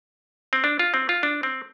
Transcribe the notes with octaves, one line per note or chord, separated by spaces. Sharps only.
C4
D4
F4
C4
F4
D4
C4